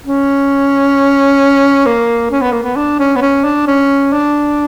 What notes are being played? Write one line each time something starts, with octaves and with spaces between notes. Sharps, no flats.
C#4
A#3
C#4
B3
A#3
B3
D4
C#4
B3
C#4
D4
C#4
D4